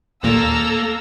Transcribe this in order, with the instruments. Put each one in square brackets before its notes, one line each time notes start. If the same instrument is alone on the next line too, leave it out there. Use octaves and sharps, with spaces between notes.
[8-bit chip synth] D#2 A#2 [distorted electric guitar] A#3 [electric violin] A4 A#5 [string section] E6